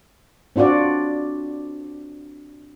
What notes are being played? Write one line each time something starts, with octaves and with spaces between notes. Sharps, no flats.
C4 D4 F4 F#4 D5